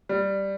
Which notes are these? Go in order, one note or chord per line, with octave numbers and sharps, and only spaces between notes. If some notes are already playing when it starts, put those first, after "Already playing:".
G3